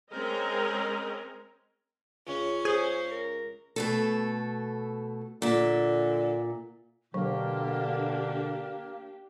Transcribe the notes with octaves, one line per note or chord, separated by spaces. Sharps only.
G#3 C4 C#4 A#4 D#5
C#2 C#4
G#4 C5
A#4
B2 A3 A4
A#2 D3 E5
B2 D3 F#3 A#3 D4 G4